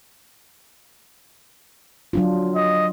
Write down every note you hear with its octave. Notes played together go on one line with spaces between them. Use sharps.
F#3 D4 F4
D#5